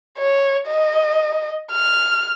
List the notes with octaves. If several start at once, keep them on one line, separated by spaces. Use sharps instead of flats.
C#5
D#5
F6